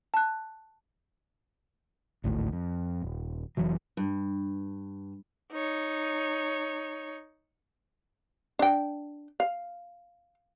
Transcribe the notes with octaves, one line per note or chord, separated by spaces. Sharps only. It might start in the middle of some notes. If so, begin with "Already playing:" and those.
A5 F#6
G#1 D2 A2
F2
D#1
F1 E3 F#3
G2
D#4 C#5
D4 G5
F5